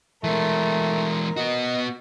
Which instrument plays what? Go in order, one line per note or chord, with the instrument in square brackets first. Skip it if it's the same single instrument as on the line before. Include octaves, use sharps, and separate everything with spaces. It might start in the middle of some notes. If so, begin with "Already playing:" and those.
[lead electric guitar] E3 G#3 [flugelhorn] A3 [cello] A#4
[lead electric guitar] B3 F#4 [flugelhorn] D#5